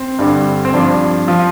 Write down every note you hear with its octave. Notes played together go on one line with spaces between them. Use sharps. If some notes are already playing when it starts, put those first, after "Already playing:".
Already playing: C4
G2 D3 G3
C4
G2 F3 D4
F3 F4